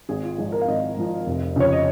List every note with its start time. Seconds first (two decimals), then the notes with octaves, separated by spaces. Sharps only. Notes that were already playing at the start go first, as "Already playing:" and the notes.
0.09 G#1 G#4
0.23 F4
0.38 G#2 F3 G#4
0.52 A#4
0.61 F5
0.68 G#1 D#5
0.96 G#2 F3
1.26 F1
1.56 F2 C#3 C#5
1.72 D#5